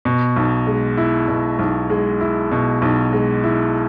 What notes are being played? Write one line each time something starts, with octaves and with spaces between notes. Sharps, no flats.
B2
B1
G#3
E4
B2
B1
G#3
E4
B2
B1
G#3
E4